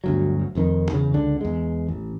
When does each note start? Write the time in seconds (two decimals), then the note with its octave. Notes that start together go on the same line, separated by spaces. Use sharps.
0.04 G1 D2 F#3
0.55 F1 F2 D#3
0.92 E2 C#3
1.14 C#2 D3 D4
1.41 E2 G#3
1.89 A1